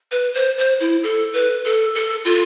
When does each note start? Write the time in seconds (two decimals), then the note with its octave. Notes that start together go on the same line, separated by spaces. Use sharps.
0.12 B4
0.35 C5
0.58 C5
0.80 E4
1.03 A4
1.33 B4
1.65 A4
1.95 A4
2.25 F4